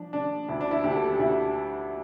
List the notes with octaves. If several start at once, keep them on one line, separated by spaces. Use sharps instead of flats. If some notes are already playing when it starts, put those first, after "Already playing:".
Already playing: F3 D4
D3 D4
D2 E4
D4
E4
D2 G4
A4
G4
D2 E4